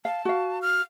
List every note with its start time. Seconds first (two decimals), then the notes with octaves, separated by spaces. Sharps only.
0.05 F5 A5
0.25 F#4 F5
0.62 F6